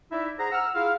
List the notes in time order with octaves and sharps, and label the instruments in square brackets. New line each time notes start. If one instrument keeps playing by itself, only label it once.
[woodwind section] D#4 E4 D5 E5
G#4 C5 F#5 A#5
F#5 E6 F6
E4 F4 G#4 F5